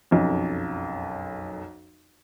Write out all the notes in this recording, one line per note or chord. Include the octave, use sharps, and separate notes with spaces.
F#1 B1 F2